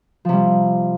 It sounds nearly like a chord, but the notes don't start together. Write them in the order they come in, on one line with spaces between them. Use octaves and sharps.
F3 C3 G3